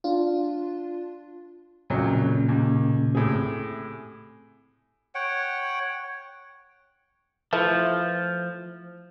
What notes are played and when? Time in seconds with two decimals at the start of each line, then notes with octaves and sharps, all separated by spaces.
0.04 D4 F4
1.90 A#1 F2 A#2 C#3 F#3
2.48 D#2
3.15 A2 C3 G#4
5.15 C#5 F#5 G5
7.53 E3 F3 A3 E4